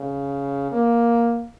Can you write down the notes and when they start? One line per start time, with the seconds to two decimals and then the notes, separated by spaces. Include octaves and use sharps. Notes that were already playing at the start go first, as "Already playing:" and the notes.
Already playing: C#3
0.72 A#3